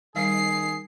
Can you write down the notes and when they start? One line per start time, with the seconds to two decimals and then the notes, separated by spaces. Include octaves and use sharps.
0.16 D#3 G3 G#4 C7